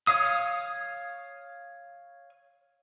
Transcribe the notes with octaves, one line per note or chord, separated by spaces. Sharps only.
C#5 F5 D#6